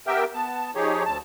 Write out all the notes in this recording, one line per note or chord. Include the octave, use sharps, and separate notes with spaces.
B3 G4 A#4 E5 G5
B3 A5
F3 D#4 G4 G#4 C#5
D2 A5